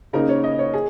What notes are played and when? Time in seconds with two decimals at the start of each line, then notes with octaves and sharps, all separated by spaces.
0.13 C#3 A#3 D#4 A#4
0.29 C#5
0.44 D#5
0.59 C#5
0.74 G#4